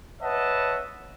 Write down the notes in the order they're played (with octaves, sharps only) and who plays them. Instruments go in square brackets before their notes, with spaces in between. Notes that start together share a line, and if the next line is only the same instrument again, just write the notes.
[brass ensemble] B4 C#5 D#5 E5 F#5 A5